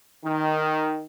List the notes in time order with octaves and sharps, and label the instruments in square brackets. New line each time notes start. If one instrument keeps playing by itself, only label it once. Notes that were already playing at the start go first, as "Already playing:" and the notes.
[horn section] D#3